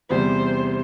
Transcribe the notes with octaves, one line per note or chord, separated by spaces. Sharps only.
E2 C3 G3 C5